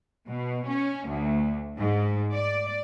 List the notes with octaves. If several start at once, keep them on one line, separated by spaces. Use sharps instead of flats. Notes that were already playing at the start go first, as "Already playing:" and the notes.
B2
C#4
D2
G#2
D5